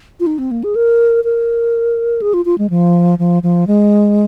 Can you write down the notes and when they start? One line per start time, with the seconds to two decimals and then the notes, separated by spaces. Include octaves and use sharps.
0.20 F4
0.27 D#4
0.39 C4
0.51 A#3
0.64 G#4
0.76 A#4
1.24 A#4
2.22 G#4
2.34 F4
2.45 F4
2.58 G#3
2.70 F3
3.19 F3
3.43 F3
3.67 G#3